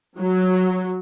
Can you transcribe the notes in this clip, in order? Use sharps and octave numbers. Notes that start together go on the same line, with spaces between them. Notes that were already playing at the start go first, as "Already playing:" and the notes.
F#3